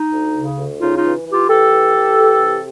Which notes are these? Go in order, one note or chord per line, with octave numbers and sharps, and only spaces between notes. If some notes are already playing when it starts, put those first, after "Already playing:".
Already playing: D#4
D2
C#3
D2
C#3 D#4 F4
D#4 F4
E3
E3
F4 G4
E3 G4 A4
E3
E3
E3
C3